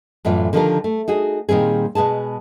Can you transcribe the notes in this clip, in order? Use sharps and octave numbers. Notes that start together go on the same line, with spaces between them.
F#2 A2 E3 F4 D5
D3 D#3 F3 D4 G4 A#4
A3
D#4 F#4 G#4
A#2 D#3 G3 C4 G#4
B2 G#3 B3 G#4 A5